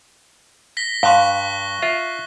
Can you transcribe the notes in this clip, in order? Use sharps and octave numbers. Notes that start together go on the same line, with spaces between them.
A#6 B6 G7
G2 F5 C6 C#6 F#6 G7
F4 E5